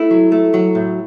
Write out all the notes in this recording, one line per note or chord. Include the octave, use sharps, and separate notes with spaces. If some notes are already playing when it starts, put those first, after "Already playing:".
Already playing: A3 E4
F#3
A3
F#3
A2